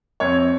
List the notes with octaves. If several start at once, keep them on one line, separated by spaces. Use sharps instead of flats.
F2 C#5